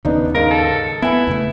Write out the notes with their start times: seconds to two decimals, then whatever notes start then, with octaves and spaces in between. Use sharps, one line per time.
0.05 D#2 C#3 B3 D4 D#4
0.34 G#2 A#4 F5
0.51 A4
1.02 B3 E4 B4 G#5
1.27 E2 C#3 A3